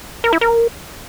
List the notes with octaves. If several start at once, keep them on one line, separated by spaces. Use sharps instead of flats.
A#4
E4
A#4